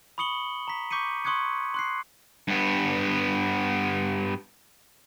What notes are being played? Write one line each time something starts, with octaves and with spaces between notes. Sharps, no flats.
B5 C#6 D#6 C#7 F#7 G7
A#5 B6
C#6 D6 G6 B6 C#7 D#7
C6 C#6 D#6 F#6 G#6 C#7
C6 F#6 C7
G2 B3